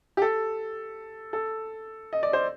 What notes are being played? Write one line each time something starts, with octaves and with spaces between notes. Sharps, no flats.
G4
A4
A4
D#5
D5
C5